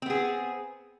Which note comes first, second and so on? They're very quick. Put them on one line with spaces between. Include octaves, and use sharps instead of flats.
C4 B3 G#4